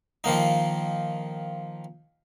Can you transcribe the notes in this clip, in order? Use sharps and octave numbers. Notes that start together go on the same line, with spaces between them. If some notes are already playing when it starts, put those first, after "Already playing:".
D#3 F3 A#3 D#4